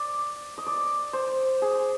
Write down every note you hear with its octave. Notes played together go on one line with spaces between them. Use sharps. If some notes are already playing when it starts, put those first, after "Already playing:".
Already playing: D5
D#5
D5
C5
G#4